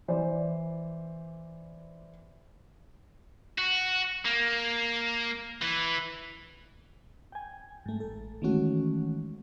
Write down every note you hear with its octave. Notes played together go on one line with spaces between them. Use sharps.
E3 C5 D5
F#4
A#3
E3
G5 G#5
G#2 A3
A1 A4
D#3 E3 G#3 A3 C#4 F#4